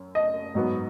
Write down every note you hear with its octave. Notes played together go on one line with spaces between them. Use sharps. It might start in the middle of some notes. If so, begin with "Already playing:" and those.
Already playing: F#2
D#5
G#2 F#3 B3